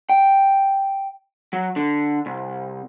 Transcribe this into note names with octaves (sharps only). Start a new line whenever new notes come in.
G5
F#3
D3
C2